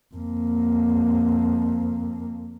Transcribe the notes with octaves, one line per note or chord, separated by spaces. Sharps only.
F2 A#3